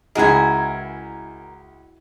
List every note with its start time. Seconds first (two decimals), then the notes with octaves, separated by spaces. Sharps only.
0.15 C#2 E4 F#4 G#4 A#4 D#5 G#5